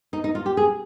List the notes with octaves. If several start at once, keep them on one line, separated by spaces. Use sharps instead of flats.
D#4
D#4
F4
G4
G#4